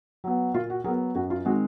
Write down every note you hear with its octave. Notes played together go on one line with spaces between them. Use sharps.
F#3 B3
A#2 F4
F#4
F#3 B3 G#4 A#4
F#2 F#4
F4
D#3 G#3 C4 F#4